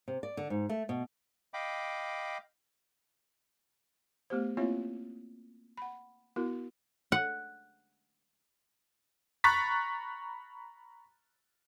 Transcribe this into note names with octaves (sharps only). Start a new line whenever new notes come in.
C3
D5
D3
G#2
A3
B2
D#5 F5 G5 B5 D6
A3 B3 G4 C5
A#3 C4 E4 F4 C#5 E5
F#5 B5
B3 E4 F#4 A#4
F#5
A#5 B5 C#6 F#6 A6 B6